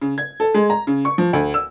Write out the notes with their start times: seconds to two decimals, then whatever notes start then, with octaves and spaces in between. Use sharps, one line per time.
0.02 C#3
0.18 G#6
0.40 A4
0.54 G#3
0.70 A#5
0.87 C#3
1.05 C#6
1.18 F3
1.33 D2
1.54 E6